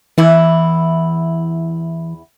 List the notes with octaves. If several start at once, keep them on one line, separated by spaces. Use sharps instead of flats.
E2 E3 E4